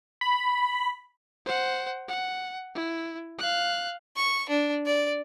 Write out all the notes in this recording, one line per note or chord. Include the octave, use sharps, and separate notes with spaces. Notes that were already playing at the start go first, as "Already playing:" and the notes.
B5
C5 F#5
F#5
E4
F5 F#6
C#6
D4
D5